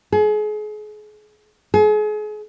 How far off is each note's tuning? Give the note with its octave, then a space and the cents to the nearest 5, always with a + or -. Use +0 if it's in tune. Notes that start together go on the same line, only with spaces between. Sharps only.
G#4 +35
G#4 +35